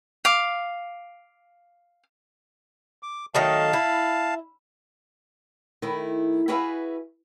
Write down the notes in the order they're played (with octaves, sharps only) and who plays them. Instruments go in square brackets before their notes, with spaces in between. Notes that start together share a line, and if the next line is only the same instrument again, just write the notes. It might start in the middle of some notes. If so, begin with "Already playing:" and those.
[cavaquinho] F5 D6
[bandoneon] D6
[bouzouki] D#3 F#3 A3 [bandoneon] F5 A5
[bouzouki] E4
[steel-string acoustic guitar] D#3 A3 E4
E4 F#4 G#4 B4 E5 F5